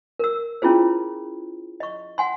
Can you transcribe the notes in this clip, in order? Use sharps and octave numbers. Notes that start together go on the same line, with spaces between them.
A#4 E6
C#4 E4 F4 G#4 C5
D#5 C#6
F#5 G#5 C6